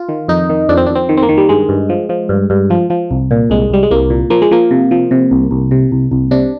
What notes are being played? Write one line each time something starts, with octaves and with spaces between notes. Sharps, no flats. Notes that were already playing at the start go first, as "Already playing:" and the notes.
Already playing: F4
D#3
F2 D#4
D#3
F2 D4
C4
F2 D4
C4
D#3
C4
A#3
D#3
G3
G2 G#3
G2
F3
F3
G2
G2
F3
F3
C2
A#2
C2 G#3
C2 G3
G#3
C2 A#3
A#2
F3 A#3
G#3
F3 A#3
C3
F3
C3
C2
C2
C3
C2
C2
C3 D4